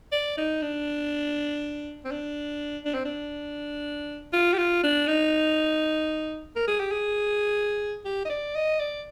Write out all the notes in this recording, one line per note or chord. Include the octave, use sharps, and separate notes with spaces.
D5
D#4
D4
C4
D4
D4
C4
D4
F4
G4
F4
D4
D#4
A#4
G#4
G4
G#4
G4
D#5
D5
D#5
D5